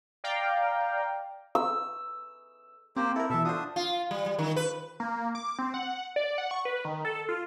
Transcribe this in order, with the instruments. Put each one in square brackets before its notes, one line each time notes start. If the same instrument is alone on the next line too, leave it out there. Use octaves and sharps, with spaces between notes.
[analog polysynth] D5 F5 G5 A#5
[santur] E6
[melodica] A#3 G4 C5 [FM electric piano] C4
[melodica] E4 [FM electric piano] A4 A#4
[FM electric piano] B2 E3 [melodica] A4 E5
[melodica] D4 D#6 [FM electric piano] F4 F#4 C5
[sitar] F4
G3
G3
D#3
B4
[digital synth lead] A#3
D6
C4
F#5
D5
F#5
C#6
B4
D#3
A4
F4